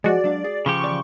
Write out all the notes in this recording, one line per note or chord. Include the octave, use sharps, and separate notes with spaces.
F3 G#3 F#4 D5
F#3 D4 F5
G#4
C#3 F3 G4 C#6
E3 D5